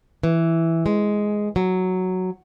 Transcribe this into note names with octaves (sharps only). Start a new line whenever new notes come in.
E3
G#3
F#3